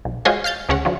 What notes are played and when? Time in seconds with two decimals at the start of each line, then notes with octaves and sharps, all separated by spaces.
0.05 B1
0.25 G#3 F4 F#4 G#4 C5 C#5
0.44 F5 F6 G6 A6
0.69 D2 C#3 C#4 C#5 F#5
0.85 D3 F3 F#3